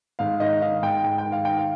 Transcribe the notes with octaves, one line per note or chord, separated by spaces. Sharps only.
G#2 F5
D#3 D#5
D#3 F5
G#2 G5
G#2 G5
G5
D#3
F5
D#3 G5
F5